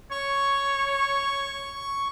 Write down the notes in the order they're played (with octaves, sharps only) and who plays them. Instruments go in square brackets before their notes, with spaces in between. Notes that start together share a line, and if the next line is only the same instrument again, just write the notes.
[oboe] C#5 [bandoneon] C#6